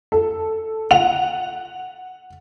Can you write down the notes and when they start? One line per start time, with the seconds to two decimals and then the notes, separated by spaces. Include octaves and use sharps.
0.12 A4
0.91 F#5 F7